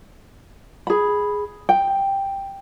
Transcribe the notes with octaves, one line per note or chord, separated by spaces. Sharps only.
G#4 B5
G5